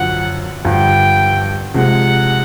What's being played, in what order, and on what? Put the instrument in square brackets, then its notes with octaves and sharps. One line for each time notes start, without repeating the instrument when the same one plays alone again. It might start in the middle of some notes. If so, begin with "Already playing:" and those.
Already playing: [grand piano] F#2 D3 F3 [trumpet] F#5
[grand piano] G2 D3 F3 [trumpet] G5
[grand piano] C3 F3 G#3 [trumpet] F#5